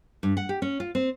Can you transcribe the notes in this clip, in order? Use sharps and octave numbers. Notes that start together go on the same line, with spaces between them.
G2
F#5
G4
C#4
F4
C4